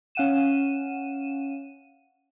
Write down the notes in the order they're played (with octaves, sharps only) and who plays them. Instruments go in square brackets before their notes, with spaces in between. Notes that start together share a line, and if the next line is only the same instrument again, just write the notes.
[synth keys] C#4 F5 F#5 D#7 E7